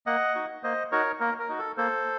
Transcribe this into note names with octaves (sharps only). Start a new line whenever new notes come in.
A#3 D#5 F#5
D#4 F#4
A#3 C5 D#5
D#4 F#4 A#4 C#5
A#3 A#4
A#4
D#4 F#4
A4
A#3 A4 C5